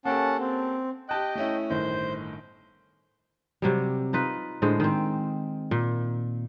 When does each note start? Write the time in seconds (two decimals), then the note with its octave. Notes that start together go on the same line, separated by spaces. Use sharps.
0.05 A#3 C#4 G4 A4 F#5 A5
0.39 C4
1.09 G4 D#5 G5 A5 F#6
1.35 A3 C#4 E4
1.70 G1 A2 D#3 C5 G6
3.62 C3 F#3 G3
4.13 D#4 F4 B4
4.62 A2 D3 G#3 C5
4.80 D#3 C4
5.71 A#2